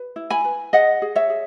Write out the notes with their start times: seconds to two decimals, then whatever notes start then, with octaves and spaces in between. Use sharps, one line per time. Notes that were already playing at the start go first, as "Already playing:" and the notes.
Already playing: B4
0.16 E4
0.30 G#5 B5
0.44 B4
0.73 G#4 D#5 F#5
1.02 G#4
1.16 C#5 E5
1.30 G#4